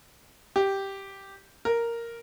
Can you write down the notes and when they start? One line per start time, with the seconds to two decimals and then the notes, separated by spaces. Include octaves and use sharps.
0.56 G4
1.65 A#4